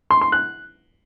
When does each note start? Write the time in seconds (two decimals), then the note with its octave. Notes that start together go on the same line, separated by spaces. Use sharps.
0.11 C6
0.21 C6
0.32 F#6